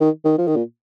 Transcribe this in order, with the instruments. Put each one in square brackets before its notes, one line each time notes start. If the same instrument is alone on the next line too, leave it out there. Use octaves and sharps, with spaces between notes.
[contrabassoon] D#3
D#3
F3
D#3
A#2